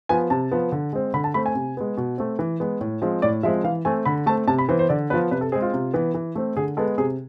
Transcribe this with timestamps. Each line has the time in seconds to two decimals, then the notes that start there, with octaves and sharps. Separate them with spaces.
0.09 F3 B3 G#5
0.30 C3 A5
0.52 F3 B3
0.72 D3
0.93 G#3 C4
1.14 D3 B5
1.24 A5
1.34 A3 C4 B5
1.46 G#5
1.55 C3
1.77 G#3 B3
1.97 B2
2.18 A3 C4
2.39 E3
2.60 G#3 B3
2.81 A2
3.02 F3 G#3 C4
3.22 A2 D5
3.43 F3 G#3 C4 E5
3.64 E3 F5
3.85 A3 C4 G#5
4.05 D3 B5
4.26 A3 C4 A5
4.47 C3 A5
4.58 B5
4.69 E3 B3 C5
4.79 C5
4.89 D3 D5
5.10 B3 B4
5.14 F3
5.31 C3 B4
5.41 A4
5.52 G#3 C4 G#4
5.62 F4
5.73 C3
5.94 E3 B3
6.14 E3
6.35 A3 C4
6.57 D3 G#4
6.77 G#3 B3 A4
6.98 C3 G#4